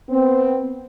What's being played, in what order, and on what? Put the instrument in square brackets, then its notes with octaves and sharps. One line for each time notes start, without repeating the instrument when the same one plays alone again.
[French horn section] B3 C4